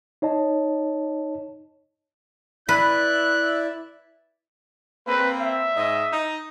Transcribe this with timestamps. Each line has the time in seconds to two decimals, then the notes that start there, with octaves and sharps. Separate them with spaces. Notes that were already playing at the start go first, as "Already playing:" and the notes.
0.22 D#4 C#5 D#5 A5
2.69 E4 B4 D5 E5 F#6
5.07 A#3 C4 B4
5.40 E5
5.76 G#2 D#5
6.12 D#4